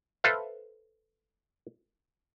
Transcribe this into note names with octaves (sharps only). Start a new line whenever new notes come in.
A4 B4 C5 E5 F5